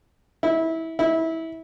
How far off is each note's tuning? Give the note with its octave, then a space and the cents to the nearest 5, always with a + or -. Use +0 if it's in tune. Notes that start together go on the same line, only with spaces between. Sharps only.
E4 -20
E4 -20